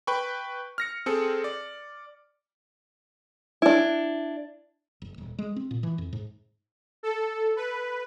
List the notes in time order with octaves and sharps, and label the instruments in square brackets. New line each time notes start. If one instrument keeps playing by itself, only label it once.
[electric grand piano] B4 G5 B5 C#6
F6 A#6 C#7
C4 G#4 A4 C#7
D5
[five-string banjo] D4 E4
[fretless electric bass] F#1
D#1
G#3
C4
A#2
E3
F2
G#2
[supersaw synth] A4
B4